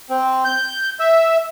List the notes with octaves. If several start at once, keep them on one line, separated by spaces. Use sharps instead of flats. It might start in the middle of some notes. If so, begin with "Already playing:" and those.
C4
G6
E5